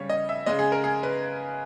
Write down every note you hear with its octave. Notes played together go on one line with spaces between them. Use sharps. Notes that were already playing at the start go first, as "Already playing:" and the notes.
Already playing: C#3 G3 C#5
D#5
E5
C#3 G#3 D#5
G#4
A#4
G#4
B4